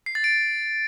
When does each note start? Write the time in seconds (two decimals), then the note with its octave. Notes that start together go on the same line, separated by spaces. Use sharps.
0.06 C7
0.15 A6
0.24 D7